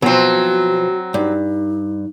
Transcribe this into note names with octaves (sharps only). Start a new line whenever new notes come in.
B2 F3 F#3 C4 F#4
G2 D#4